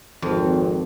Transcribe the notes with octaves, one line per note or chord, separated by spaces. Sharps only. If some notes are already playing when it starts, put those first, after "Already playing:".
G#1 F2